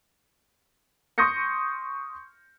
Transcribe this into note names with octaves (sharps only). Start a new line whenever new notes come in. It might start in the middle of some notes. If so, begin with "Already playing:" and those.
C6 C#6 D#6 G6 A#6 C#7